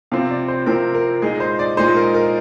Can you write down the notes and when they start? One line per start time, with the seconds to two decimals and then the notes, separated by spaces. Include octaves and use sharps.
0.12 C3 F3 C4 F5
0.30 D5
0.48 C5
0.66 C3 F3 C4 A#4
0.94 A#4
1.22 A#2 G#3 D#4 G#4
1.40 C5
1.59 D5
1.77 A#2 G#3 D#4 C5
1.96 A#4
2.14 A#4